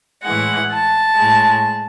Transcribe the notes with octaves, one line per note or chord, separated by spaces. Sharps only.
A2 E3 G#3 F#5
A5
A2 G#3